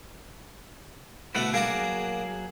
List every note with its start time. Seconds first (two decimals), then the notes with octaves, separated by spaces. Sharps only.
1.35 B2 D3 A3 E4 B4 F#5
1.54 F#3 A#3 D4 F#4 G#4